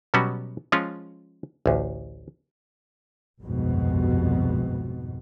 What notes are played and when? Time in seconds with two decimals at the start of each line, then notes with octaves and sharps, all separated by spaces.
0.14 B2 F#3 G3 B3 C#4 F#4
0.72 F3 G#3 C#4 F4
1.66 A1 D2
3.42 G1 C2 F2 G#2 B2